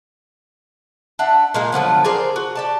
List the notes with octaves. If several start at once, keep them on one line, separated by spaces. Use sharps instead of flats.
D4 E5 F#5
A#2 G#3 A#3
D3 F3 F#3 B3
G#4 A#4 C5 D5
F#4
G4 D5 A5